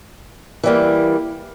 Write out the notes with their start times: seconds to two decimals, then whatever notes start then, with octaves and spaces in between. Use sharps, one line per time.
0.63 E3 G3 A#3